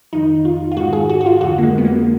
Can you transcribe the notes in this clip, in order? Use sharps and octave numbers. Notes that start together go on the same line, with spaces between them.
F2 D#3 D#4
F4
F4
G#2 D#3 F#4
G#4
F#4
F#4
F4
F2 D3 F#4
A#3
G#3
B3
A#3